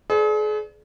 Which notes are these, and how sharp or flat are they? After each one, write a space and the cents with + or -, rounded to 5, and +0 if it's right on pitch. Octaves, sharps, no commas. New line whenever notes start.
G#4 +40 B4 +45 D5 +0